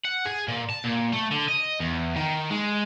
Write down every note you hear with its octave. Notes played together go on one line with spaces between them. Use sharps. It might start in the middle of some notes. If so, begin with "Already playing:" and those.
F#5
G#4
A#2
A5
A#2
A3
D3
D#5
E2
D#3
G#3